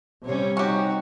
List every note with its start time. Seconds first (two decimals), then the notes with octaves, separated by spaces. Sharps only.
0.25 C3 G3 C#4 C#5
0.57 C#4 D#4 F#4 G4